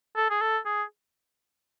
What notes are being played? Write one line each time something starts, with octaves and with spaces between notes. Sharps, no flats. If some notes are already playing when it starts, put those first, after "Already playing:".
A4
G#4
A4
G#4